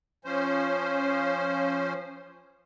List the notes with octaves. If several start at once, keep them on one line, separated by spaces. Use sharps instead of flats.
F3 C#4 C5